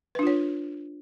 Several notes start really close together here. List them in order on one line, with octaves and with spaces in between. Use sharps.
B4 D4 F4 C#5